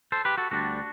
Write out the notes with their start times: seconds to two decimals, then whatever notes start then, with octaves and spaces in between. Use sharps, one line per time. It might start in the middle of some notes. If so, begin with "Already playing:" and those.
0.12 A4 C5
0.25 G4 B4
0.38 F#4 A4
0.51 D2 D3 G3 D4 F#4